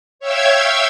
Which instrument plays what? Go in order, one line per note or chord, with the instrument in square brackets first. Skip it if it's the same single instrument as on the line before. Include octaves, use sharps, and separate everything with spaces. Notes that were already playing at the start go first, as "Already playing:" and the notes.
[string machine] C#5 E5 F5 G5 E6 G#6